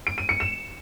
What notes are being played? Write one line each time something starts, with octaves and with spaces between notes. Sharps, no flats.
D7
D#7
C#7
E7